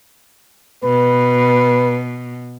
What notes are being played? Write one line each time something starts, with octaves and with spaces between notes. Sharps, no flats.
B2 B4